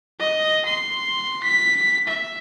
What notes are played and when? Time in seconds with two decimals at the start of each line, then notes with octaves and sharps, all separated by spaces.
0.20 D#5
0.65 C6
1.44 B6
2.07 E5